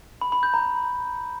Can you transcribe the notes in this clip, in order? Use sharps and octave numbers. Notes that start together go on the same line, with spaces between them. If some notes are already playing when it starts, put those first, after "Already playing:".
B5
B5
G6
A#5